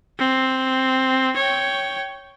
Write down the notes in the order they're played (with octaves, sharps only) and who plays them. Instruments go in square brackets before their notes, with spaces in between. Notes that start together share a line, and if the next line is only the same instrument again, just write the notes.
[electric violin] C4
C#5 G5